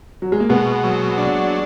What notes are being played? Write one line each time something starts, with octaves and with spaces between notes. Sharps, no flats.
F#3
G#3
A#3
B2 G#3 B3
F#3
D4